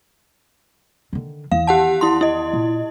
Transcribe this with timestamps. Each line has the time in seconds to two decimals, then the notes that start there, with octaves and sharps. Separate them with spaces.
1.13 D3 D#3
1.52 E2 D#3 F5
1.67 G4 F#5 A5
2.01 E4 C6
2.21 E4 D#5
2.53 A#2